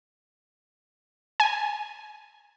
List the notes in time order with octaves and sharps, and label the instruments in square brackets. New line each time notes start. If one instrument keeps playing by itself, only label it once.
[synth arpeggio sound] G#5